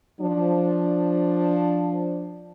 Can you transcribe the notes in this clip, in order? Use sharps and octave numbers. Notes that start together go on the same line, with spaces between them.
F3 D4